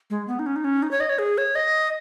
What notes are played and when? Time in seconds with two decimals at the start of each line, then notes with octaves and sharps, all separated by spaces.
0.10 G#3
0.28 B3
0.39 D#4
0.46 C#4
0.56 D#4
0.64 C#4
0.82 D#4
0.91 C#5
1.00 D#5
1.09 C#5
1.19 G#4
1.38 C#5
1.55 D#5